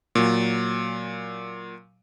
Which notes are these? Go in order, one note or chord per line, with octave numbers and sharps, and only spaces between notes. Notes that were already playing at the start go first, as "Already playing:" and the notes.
A#2 F#3